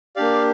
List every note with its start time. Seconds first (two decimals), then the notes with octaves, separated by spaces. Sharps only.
0.16 A#3 D4 G4 D5 F5